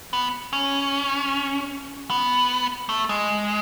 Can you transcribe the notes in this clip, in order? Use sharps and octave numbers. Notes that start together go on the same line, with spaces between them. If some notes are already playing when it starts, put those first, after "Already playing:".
B3
C#4
B3
A3
G#3